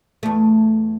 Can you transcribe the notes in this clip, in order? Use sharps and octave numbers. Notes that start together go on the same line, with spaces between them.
E2 A3